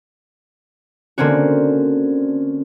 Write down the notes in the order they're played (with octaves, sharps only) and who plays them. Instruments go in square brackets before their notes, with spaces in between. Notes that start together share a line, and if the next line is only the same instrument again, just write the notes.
[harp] D3 A#3 C4 C#4 F#4